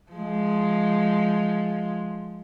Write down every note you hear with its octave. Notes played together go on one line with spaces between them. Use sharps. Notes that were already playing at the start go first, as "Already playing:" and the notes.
F3 G#3